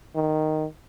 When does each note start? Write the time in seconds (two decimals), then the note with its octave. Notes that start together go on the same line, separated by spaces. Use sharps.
0.15 D#3